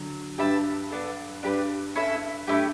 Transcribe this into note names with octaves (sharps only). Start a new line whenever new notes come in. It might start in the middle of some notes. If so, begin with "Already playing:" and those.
Already playing: D3 F#3
G2 G4 B4 E5 A5
B3 D4 A4
G2 D4 G4 B4
C#4 E4 A4 E5
G2 A3 E4 G4